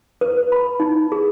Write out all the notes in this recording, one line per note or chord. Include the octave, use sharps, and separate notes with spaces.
B4
B5
D#4
G#4